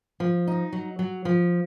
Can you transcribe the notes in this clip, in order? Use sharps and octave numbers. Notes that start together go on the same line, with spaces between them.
F3
D#4
F#3
F#3
F3